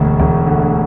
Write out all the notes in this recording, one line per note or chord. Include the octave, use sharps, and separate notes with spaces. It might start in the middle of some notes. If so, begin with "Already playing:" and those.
Already playing: E1 D2 A3
E1
D3